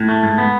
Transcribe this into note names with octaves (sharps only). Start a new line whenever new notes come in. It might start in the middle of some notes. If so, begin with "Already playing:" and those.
Already playing: A2
A3
G#2
B3